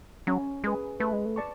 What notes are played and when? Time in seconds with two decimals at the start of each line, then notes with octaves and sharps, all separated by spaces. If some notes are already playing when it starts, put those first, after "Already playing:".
0.27 F#3 C#4
0.64 G#3 G#4 B4
1.00 A3 B4
1.13 G#3
1.26 A3
1.36 D5 A5 C#6